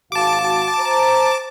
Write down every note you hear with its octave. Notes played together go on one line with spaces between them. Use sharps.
G#1 F#4 F5 A5 D6
C5 A#5